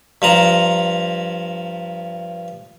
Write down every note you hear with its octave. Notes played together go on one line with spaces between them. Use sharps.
G2 F3 A#5